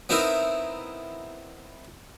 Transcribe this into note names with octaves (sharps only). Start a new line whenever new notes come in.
B3 C4 D#4 E4 A#4